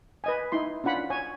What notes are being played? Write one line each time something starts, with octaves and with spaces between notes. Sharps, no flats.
B4 D#5 G#5
D#4 E4 C6
C#4 D4 F4 F#5 B5
C#5 G#5